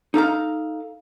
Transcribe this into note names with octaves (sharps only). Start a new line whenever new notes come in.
D#4 A4 F5 A#5